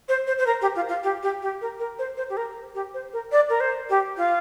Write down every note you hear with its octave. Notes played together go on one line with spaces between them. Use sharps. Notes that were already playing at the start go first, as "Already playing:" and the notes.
C5
C5
C5
A#4
G4
F4
F4
G4
G4
G4
A#4
A#4
C5
C5
G4
A#4
G4
C5
A#4
D5
A#4
C5
G4
F4